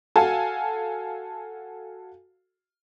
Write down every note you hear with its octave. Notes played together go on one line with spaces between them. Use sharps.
F#4 A4 F5 G#5 A5